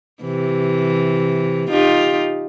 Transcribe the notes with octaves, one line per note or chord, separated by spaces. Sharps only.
C3 E3
D#4 F4 G4